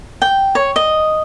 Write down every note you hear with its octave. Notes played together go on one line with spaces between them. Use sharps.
G5
C#5
D#5